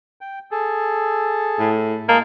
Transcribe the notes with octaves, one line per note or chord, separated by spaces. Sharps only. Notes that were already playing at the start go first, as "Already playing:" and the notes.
G5
G#4 A4
A2
G#3 A#3 F5 A5